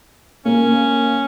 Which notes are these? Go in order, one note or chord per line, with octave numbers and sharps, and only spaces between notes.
A#3 C#4